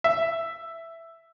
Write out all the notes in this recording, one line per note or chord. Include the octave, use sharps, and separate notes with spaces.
E5